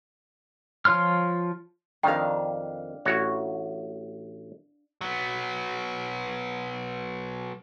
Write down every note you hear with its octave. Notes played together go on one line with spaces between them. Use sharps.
F3 F4 C#5 C6 F6
F2 D#3 D4 F5 G5
A1 F#4 C#5
F#3 B3